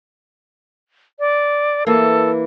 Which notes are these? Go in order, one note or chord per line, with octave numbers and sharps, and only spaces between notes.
D5
E3 A#3 A4